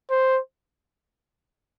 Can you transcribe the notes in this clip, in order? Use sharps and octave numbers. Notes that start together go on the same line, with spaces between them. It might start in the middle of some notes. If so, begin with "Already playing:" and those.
C5